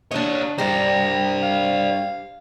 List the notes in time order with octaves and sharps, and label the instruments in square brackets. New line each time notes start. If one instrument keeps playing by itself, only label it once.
[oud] D4 D#5 [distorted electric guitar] G4 C#5
[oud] G2 G3 [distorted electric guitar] C5 D5 [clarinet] A#5
[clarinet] F5